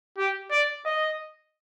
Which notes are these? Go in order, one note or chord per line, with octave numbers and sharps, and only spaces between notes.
G4
D5
D#5